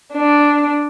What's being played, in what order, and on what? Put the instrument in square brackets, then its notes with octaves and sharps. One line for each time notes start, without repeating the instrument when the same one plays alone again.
[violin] D4